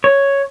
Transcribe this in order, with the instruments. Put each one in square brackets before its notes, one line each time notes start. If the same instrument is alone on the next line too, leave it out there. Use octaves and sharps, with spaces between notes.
[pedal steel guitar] C#5